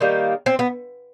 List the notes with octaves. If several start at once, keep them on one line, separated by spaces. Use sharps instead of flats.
D#3 G3 A#3
C4
B3